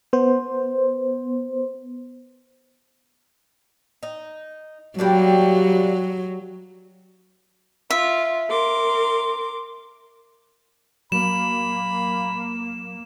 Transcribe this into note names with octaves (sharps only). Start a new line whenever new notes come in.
B3 C5
D#4
F#3 G3 A#3 D4
F4 E5
A#4 C6 D6
F#3 A#3 B5 E7